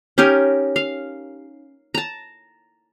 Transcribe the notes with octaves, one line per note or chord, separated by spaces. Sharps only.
C#4 D#4 G4 A#4
F5
A5 A#5